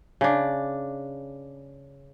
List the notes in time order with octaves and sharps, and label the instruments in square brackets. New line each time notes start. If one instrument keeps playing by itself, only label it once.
[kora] C#3 D4